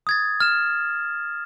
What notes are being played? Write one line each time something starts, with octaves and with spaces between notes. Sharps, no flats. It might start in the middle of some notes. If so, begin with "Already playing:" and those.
D#6 G#6 A6
F6 E7